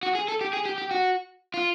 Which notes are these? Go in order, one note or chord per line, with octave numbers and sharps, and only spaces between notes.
F#4
G#4
A4
G4
G#4
G4
G4
F#4
F4